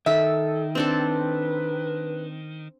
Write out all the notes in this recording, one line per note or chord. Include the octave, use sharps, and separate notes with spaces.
D#3 A4 E5
C4 D4 A4 B4